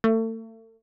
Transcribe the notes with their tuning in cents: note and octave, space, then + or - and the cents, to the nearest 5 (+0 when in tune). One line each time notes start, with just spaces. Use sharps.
A3 +35